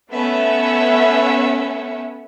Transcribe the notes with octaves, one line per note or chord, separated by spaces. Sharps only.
A3 B3 C#4 C#5 E5